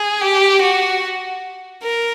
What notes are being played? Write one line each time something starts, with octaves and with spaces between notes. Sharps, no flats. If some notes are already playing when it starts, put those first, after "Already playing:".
Already playing: G#4
G4
F#4
A#4